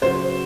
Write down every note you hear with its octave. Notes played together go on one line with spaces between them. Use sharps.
C#3 F#3 C#4 F#4 C5